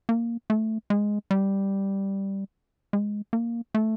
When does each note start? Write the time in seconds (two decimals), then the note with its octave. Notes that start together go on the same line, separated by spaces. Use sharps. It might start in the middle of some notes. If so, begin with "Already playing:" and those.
0.09 A#3
0.50 A3
0.90 G#3
1.31 G3
2.93 G#3
3.33 A#3
3.75 A3